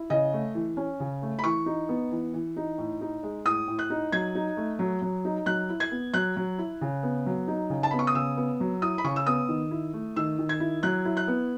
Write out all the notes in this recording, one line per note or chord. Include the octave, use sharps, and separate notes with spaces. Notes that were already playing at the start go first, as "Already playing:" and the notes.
Already playing: E4
C#3 D#5
A3
E3
C#4
C#3
A3
B5
E3 C#6
D#4
B3
E3
E3
D#4
A2
D#4
G#3
A2 D#6
A2
F#6
D#4
F#3 G#6
D#4
A3
F#3
F#3
D#4
F#3 F#6
E4
G#6
B3
F#3 F#6
F#3
E4
C#3
B3
F#3
D#4
C#3
A5
B3 B5
C#6
D#6
C#3 E6
B3
F#3
E4 D#6
B5
C#3 C#6
E6
B3 D#6
D#3
E4
A3
D#3 E6
D#3
G#6
E4
F#3 F#6
E4
F#6
B3